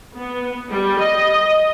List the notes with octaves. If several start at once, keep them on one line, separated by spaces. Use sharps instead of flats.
B3
G3
D#5